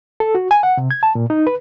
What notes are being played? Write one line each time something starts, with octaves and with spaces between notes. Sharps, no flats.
A4
F#4
G#5
F#5
C3
G#6
A5
A#2
D#4
B4